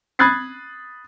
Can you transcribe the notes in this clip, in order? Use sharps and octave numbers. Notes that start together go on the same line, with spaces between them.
B5 D#6 F#6 G#6 A6 C7